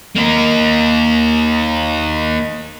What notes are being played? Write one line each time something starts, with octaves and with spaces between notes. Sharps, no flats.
A#3 D#4